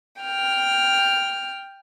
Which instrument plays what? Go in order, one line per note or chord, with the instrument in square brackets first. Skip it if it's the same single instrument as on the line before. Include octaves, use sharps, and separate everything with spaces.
[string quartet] G5 F6